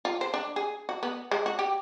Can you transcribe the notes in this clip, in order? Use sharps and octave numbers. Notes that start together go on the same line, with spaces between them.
F4
C5
D4
G#4
F#4
B3
G#3
F#4
G4